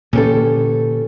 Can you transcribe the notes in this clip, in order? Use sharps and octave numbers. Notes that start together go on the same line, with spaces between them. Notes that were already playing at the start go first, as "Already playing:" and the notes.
A#2 D3 E3 C#4 G4 A4